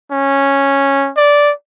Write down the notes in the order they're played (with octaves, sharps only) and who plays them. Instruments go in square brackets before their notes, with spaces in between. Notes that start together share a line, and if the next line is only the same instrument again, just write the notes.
[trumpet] C#4
D5